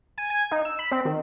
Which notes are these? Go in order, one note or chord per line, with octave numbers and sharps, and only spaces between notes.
G#5
G#5
D#4
E6
B5
C4
D#3